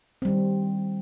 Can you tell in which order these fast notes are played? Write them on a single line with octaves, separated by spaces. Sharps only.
C4 G3 D#3